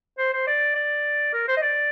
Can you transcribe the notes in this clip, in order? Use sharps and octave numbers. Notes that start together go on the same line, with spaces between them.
C5
C5
D5
D5
A#4
C5
D#5
D5